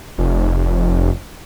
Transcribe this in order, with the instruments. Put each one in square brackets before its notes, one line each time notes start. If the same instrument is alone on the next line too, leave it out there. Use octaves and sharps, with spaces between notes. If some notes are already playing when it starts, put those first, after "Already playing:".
[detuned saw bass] F1